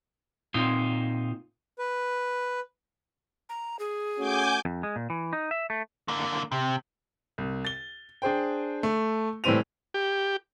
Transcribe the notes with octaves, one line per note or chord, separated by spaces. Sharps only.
A#2 C4 D#4 F4
B4
A#5
G#4
A3 C#4 F#4 G#5 D6 G6
F2
G#3
A#2
E3
D#4
E5
A3
D3 A#3
C3
C2
A6 G7
D4 G#4 C5 G5
A3
A2 E3 G3 C4 D#7 F7
G4